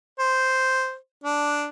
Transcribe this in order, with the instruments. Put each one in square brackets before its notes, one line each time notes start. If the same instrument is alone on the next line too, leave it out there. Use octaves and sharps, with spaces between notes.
[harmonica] C5
D4